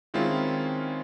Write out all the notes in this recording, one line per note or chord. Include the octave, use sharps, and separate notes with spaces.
D#3 G#3 C4 C#4 E4 F4